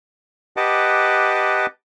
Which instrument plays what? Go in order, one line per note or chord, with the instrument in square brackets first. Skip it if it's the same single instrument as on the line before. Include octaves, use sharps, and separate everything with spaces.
[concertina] G4 B4 D#5 F#5 A5 D6